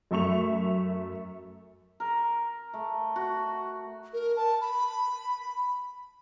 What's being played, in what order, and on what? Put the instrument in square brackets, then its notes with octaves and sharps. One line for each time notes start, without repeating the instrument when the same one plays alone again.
[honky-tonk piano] F#2 A3 E5 C#6 F7
[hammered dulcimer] A#4
A3
F#4
[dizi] A#4
A5
B5